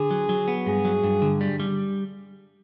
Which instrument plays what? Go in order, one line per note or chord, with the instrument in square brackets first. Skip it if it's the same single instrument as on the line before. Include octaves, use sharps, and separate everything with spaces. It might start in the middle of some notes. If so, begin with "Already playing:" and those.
Already playing: [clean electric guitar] D3 [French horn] G#4
[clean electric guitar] F#3
F#3
B3
[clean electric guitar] G2 [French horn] G#4
[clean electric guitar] F#3
G2
D3
G3
G3